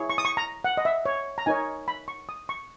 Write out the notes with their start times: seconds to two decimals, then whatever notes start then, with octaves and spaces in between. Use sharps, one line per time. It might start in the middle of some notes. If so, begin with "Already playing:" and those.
Already playing: E4 G#4 C#5
0.10 C#6
0.18 D#6
0.25 C#6
0.37 A#5
0.64 F#5
0.77 D#5
0.85 E5
1.05 C#5
1.38 A#5
1.46 D#4 A#4 C#5 G#5
1.88 B5
2.08 C#6
2.29 D#6
2.49 C#6